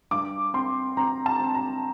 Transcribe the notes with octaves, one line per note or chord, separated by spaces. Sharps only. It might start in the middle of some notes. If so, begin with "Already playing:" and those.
G2 D6
C4 C6
C4 A#5
A5
C4
A#5